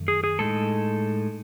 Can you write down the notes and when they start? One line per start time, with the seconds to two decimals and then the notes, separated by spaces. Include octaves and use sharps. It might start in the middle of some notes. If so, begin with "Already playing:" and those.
Already playing: F#2 D#3 A3
0.08 G#4
0.24 G#4
0.39 A2 G#3 D#4 A4